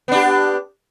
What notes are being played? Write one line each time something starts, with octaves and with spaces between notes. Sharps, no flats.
B3 D4 G4